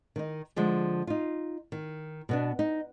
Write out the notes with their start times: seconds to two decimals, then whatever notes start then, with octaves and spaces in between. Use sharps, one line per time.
0.16 D#3 D#4
0.56 D3 F3 G#3
1.07 D#4 F4
1.72 D#3
2.29 B2 B3 D4
2.59 D#4